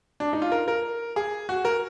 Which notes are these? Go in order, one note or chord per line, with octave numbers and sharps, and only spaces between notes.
D4
D#4
F4
A#4
A#4
G#4
F#4
A#4